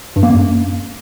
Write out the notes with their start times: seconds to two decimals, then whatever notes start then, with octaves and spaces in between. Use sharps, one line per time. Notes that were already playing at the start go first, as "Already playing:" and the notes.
0.16 G2
0.23 A#3
0.30 F#2